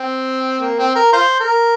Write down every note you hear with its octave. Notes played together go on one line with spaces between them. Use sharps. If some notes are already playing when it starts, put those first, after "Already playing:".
Already playing: C4
A#3
C4
A#4
F4 C5
A#4